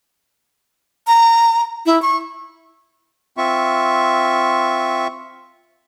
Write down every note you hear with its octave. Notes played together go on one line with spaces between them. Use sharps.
A#5
E4
C#6
C4 F4 E5 C#6